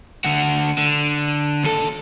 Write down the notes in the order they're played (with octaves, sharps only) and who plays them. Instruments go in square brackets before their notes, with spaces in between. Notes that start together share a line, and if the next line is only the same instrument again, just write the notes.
[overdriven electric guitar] D3 F#4
D3
D#2 A4